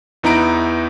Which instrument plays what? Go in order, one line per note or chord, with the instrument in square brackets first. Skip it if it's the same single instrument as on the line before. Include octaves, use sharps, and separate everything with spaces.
[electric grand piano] E2 B3 D#4 E4 A#5 D7